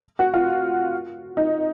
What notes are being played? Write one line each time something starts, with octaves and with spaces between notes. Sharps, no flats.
F#4
F4
D#4